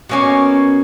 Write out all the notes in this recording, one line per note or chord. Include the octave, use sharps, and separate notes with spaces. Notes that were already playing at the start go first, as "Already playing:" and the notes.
B2 A#3 C#4 G#5